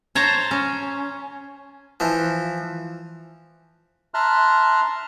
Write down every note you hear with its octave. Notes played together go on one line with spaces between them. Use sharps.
C5 C#5 A5 A#5
C#4
E3 F3
E5 A5 A#5 C6 F6 F#6